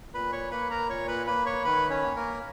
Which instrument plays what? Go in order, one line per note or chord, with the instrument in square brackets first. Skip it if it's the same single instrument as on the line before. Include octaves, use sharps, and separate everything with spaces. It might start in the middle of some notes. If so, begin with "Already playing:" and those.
[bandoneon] A#2 B4 B5
C#5 C#6
A#3 B4 B5
A#4 A#5
A#2 C#5 C#6
B4 B5
A#3 B4 B5
C#5 C#6
D#3 B4 B5
C#4 C#5
A#3
A#3 A#4